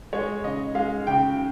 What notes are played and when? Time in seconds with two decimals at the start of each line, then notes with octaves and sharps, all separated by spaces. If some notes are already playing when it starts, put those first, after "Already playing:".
0.13 G#3 C#5
0.44 C#3 D#5
0.75 G#3 F5
1.07 C#3 G5